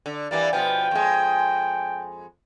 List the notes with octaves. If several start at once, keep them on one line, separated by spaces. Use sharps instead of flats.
D3
E3 G3 A#3 D5
B2 F3 B3 G5
F2 G#3